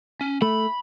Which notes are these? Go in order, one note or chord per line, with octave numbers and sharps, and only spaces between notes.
C#4
A3 B5